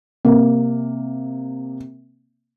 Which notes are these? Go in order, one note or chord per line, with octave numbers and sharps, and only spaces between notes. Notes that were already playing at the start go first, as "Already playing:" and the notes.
C3 A#3